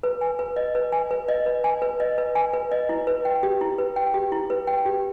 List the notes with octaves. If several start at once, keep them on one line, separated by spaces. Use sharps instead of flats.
B4
G#5
B4
D#5
B4
G#5
B4
D#5
B4
G#5
B4
D#5
B4
G#5
B4
D#5
E4
B4
G5
G4
E4
B4
G5
G4
E4
B4
G5
G4